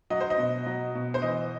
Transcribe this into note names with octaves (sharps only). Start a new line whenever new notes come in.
F#3 D#5
C5
D#5
B2
F#3
B2
C5
E3 D#5